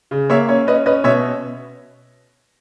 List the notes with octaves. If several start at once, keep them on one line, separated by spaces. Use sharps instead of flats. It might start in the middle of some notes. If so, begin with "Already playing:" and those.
C#3
A#3 C#5 E5
C#4 C#5
C#4 B4 D#5
C#4 B4 D#5
B2 C#5 E5